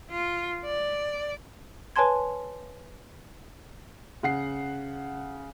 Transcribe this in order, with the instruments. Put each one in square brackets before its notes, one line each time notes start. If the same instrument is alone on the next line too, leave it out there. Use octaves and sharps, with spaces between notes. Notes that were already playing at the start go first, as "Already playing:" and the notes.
[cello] F4
D5
[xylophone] B4 C#5 G#5 A5 C6 G#6
[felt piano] C#3 F#5 C7